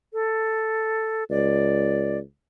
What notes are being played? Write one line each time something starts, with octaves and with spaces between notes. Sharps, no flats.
A4
C#2 D5